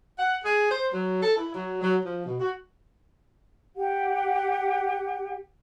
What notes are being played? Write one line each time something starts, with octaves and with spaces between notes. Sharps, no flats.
F#5
G#4
C5
F#3
A4
E4
F#3
F#3
F3
B2
F#4
G4 F#5